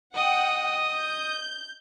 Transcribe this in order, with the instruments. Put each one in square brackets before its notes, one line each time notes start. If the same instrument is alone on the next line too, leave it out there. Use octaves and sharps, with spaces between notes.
[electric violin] D#5 D#6 [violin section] F#5 G5
[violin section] G6